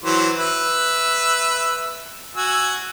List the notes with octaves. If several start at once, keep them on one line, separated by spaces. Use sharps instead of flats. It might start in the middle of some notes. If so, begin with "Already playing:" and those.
E3 F#3 C5
B4 E5
F#4 G#5 E6